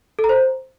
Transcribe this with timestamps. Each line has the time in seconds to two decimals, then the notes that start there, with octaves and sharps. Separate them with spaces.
0.19 A4
0.24 A#5
0.29 C5